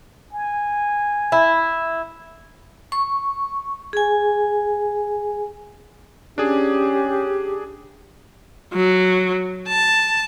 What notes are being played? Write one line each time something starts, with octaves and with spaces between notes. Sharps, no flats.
G#5
E4
C#6
G#4 G#5
C#4 D4 G4 G#4
F#3
A5